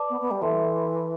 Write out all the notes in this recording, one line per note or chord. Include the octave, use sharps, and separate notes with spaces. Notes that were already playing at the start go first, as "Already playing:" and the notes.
Already playing: B4 D5 A5 D6
B3
B3
G3
E3 A4 E5 A5 C6